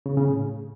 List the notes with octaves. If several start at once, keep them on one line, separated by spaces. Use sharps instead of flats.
C#3
C#3
A2